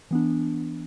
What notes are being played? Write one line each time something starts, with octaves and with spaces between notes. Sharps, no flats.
E3 B3 D4